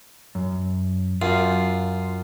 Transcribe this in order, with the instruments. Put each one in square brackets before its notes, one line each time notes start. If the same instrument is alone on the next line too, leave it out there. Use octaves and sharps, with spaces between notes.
[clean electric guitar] F#2
[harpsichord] F#2 [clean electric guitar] F4